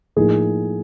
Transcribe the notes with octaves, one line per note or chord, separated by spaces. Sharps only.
A2 F3 A#3 D#4 G#4